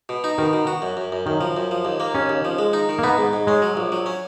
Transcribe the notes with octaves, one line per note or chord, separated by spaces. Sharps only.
B2
D#4
B2 D#3
B2
F#4
F#2
F#2
F#2
F#2 D#3
F3
F#2
F3
D#2
A#3
D#2 C#4
D#2
F3
G#3
D#4
D#3
A#3
B3 D#4
G#2
G#2
G#3 C#4
F#3
A#1
F#3
C#4